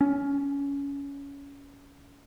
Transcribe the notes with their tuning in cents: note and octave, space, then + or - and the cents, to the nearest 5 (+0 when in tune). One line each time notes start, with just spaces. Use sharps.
C#4 +20